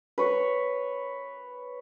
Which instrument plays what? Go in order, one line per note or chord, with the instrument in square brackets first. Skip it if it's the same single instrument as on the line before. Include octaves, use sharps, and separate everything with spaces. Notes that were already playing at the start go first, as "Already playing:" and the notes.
[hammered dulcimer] B4 C#5 C#6